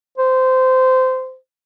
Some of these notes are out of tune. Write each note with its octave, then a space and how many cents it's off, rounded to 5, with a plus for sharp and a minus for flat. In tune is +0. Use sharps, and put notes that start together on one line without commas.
C5 -20